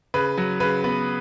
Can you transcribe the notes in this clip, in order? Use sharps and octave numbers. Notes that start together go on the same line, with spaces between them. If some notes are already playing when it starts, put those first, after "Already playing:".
C#3 B4
F#3
C#3 B4
B3